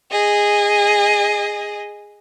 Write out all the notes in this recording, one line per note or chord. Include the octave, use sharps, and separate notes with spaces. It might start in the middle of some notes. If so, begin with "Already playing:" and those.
G#4 D#5